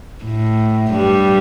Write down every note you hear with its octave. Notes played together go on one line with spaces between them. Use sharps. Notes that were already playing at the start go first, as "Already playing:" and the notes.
A2
G2 G3